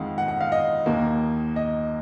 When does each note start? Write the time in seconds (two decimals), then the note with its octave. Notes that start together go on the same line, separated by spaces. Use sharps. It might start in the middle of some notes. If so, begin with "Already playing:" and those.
Already playing: F2 D#3 G#3 F5 F#5
0.18 F#5
0.28 F#5
0.41 F5
0.52 D#5
0.86 D#2 D#3 A#3
1.56 D#5